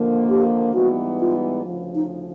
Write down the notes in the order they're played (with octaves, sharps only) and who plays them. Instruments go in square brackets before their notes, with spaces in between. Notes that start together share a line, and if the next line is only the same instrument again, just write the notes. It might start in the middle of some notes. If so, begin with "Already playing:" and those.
Already playing: [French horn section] D#2 D3 F3 A#3
[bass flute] G4
[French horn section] G#2 E3 G3 B3 D#4 [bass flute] F#4
[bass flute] F4
[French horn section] D2 C#3 F3
[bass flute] D#4